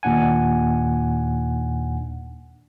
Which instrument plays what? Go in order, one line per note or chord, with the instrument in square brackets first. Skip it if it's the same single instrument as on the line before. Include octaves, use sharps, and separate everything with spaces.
[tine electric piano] D#2 A#2 D4 F#5 G#5